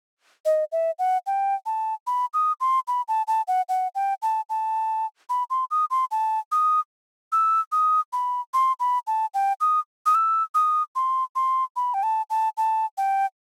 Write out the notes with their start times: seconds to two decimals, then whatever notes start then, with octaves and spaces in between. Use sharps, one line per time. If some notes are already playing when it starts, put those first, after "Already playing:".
0.45 D#5
0.72 E5
0.99 F#5
1.27 G5
1.66 A5
2.07 B5
2.34 D#6
2.61 C6
2.88 B5
3.08 A5
3.28 A5
3.48 F#5
3.69 F#5
3.95 G5
4.22 A5
4.50 A5
5.29 B5
5.50 C6
5.71 D#6
5.91 C6
6.11 A5
6.52 D#6
7.32 E6
7.72 D#6
8.13 B5
8.54 C6
8.80 B5
9.07 A5
9.34 G5
9.61 D#6
10.06 D#6
10.15 E6
10.55 D#6
10.96 C6
11.36 C6
11.76 B5
11.94 G5
12.03 A5
12.30 A5
12.57 A5
12.98 G5